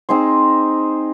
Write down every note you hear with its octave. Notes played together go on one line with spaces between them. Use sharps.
C4 D#4 G#4 C5